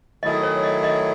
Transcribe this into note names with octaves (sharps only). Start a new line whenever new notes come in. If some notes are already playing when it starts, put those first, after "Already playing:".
D#3 F#3 A3 E4 G#4 D#5
C#5
D#5
D#5